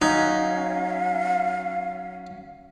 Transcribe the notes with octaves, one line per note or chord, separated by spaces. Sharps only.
F#3 C#4 D#4 F5